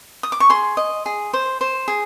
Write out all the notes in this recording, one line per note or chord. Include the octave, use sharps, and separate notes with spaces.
D#6
D6
C#6
G#4 C6
D#5
G#4
C5
C5
G#4